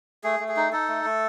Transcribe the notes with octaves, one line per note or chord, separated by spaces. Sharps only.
A3 G#4
A3
G#4
D#4
D#4 A4
A3
A3